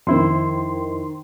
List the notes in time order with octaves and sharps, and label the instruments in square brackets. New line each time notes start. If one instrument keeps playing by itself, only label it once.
[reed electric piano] F2 E4 C5 [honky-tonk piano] D#3 C6